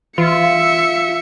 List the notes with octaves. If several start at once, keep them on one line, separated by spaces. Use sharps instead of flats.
E3 F4 E5 C#7